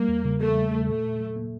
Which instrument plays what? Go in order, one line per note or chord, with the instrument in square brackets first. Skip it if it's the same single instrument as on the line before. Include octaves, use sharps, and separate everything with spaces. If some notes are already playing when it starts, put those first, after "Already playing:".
Already playing: [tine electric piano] G3 [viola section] A#3
[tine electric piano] E2
C#3
[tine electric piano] E3 [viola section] A3
[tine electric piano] G3
E2
[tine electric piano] A#2 [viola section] A3
[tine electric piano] A#2
F#3
A#3